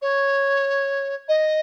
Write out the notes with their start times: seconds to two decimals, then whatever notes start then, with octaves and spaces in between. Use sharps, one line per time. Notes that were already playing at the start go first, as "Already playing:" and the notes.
0.02 C#5
1.28 D#5